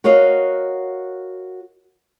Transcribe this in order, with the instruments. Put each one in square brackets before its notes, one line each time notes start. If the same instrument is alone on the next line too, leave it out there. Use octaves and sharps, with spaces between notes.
[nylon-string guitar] F#4 A#4 C#5 D#5 F5 F#5